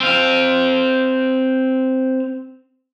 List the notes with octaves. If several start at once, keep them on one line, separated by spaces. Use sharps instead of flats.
C4 F5